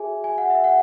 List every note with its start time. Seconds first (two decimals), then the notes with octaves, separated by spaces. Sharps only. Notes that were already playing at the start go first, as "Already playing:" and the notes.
Already playing: F#4 G#4 C#5 E5 G#5
0.24 G#5
0.38 F#5
0.50 E5
0.64 F#5